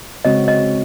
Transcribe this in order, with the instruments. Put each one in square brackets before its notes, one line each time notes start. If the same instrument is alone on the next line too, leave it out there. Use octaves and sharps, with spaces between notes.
[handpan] C#3 G#3 C4 F#4 C#5 [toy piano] D#5
[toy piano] D#5